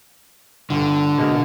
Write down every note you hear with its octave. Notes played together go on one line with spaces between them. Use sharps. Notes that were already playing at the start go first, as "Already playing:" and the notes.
G1 D3
B2 G#3 A#3